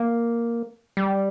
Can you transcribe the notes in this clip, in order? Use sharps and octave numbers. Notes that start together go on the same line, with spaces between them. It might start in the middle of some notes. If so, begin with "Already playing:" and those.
Already playing: A#3
G3